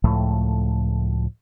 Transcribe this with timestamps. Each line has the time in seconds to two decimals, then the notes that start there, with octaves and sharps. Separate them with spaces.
0.04 C#2 A2 F3 A3